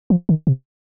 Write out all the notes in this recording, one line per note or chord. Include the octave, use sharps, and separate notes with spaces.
F3
D#3
C3